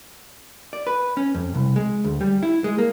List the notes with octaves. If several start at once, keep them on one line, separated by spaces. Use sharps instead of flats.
D5
B4
C#4
F2
C2
G#3
D2
G3
E4
G#3
A#3